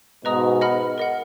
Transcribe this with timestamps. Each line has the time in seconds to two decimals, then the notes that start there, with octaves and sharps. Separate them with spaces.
0.25 G#2 B2 B4 D#5 A#5 D#6
0.61 D#5 F#5 B5 F6
0.98 A#4 D#5 F#5